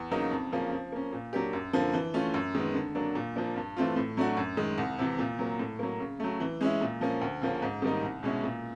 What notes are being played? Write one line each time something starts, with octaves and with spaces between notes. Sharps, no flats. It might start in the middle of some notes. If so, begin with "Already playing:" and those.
Already playing: E2
C#3 F#3 A#3 D#4
F2
C#3 F3 A#3 C#4
F3
A#3 C#4
A#2
F#3 A#3 D4 G4
F#2
D3 F3 A#3
E3
A3 C#4 F4
F#2
D#3 G#3 B3
D3
F#3 A#3 D4
A#2
F3 A#3 D4
G2
E3 A3 C4 F4
A2
F#3 A3 D4 F#4
F#2
D#3 G#3
C2
C3 E3
A#2
F#3 A#3
A2
F#3 A#3
C#3
F#3 A3
E3
G#3 C#4 E4
A#2
F3 A#3 C#4
D2
C#3 F3 A#3 C#4
G#2
D#3 G3 A#3 D#4
C2
B2 G#3 C#4 E4
A#2